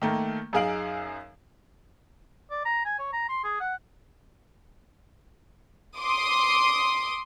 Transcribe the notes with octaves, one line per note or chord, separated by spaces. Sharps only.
D#3 A3 A#3
F#2 D#4 G#4 F5 D7 F#7
D5
A#5
G#5
C#5
A#5
C6
G#4
F#5
C6 D6 D#6